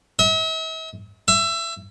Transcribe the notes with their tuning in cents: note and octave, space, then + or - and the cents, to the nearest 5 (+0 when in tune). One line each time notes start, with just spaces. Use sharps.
E5 -45
E5 +25